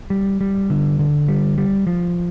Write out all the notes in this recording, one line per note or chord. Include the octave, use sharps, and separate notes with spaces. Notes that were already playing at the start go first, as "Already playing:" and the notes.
G3
G3
D3
D3
G3
G3
F3